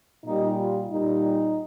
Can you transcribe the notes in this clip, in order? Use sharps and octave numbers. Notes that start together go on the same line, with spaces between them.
A#2 G3 D#4
F4
A#2 G3 D#4